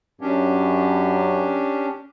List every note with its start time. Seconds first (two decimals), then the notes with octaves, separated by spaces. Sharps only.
0.21 F#2 C#4 D4 G4